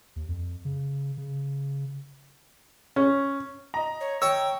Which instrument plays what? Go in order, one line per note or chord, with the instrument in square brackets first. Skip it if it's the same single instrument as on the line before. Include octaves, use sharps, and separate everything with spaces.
[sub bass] D#2
F2
C#3
C#3
[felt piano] C#4
[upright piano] D#5 A#5
[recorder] C#5
[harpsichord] C#5 [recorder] G5 [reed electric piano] E6